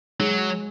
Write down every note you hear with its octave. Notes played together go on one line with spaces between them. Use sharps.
F#3 G#3